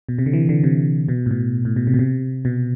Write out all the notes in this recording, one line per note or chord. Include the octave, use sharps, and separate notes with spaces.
B2
C3
D3
E3
D3
C3
B2
A2
B2
A2
B2
C3
B2
C3
B2